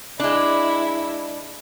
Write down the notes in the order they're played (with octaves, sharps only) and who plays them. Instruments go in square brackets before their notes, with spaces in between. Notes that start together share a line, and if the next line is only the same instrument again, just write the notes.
[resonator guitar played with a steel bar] G#3 D4 [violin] E4